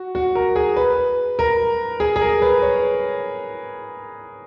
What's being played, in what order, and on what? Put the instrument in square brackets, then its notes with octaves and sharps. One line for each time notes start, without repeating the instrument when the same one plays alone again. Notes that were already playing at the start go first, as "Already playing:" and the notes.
Already playing: [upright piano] F#4
F#4
A#4
G#4
B4
A#4
G#4
G#4
A#4
B4
C#5